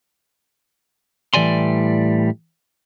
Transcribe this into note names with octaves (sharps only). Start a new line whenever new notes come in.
A2 E3 G3 D5 G#5 C6